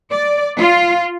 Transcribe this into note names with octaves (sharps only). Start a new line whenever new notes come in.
D5
F4